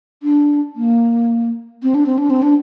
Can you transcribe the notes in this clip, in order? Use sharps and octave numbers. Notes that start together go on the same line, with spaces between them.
D4
A#3
C4
D4
C4
D4
C4
D4